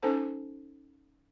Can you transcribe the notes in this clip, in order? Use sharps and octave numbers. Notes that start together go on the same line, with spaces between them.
C#4 D#4 A4 C5 A5